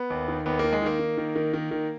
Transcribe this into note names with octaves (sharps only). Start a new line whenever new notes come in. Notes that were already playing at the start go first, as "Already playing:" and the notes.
Already playing: B3
D#2
D#3
D#2 B3
D#3 A#3
G#3
D#3 A#3
D#3
D#3
D#3
D#3
D#3